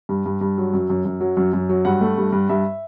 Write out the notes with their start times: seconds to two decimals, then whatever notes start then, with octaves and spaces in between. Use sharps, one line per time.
0.09 G2
0.26 G2
0.41 G2
0.58 F#3
0.74 F#2
0.90 F#2
1.05 F#2
1.21 F#3
1.37 F#2
1.53 F#2
1.69 F#3
1.85 G2 F#5
2.01 A3
2.18 G2
2.32 G2
2.49 G2 E5